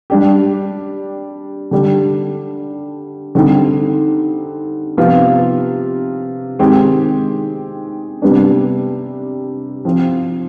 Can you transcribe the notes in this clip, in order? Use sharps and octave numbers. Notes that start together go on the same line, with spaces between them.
G3 D4 G4
D3 G3 D4 G4
D3 G3 C4 D#4 G4
C3 F3 B3 F4
D#3 G#3 C4 G4
C3 G3 B3 D4
F3 C4 F4